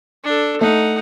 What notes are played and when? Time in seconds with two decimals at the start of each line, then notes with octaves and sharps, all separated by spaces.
0.24 D4 A4
0.61 A3 D#4 F#5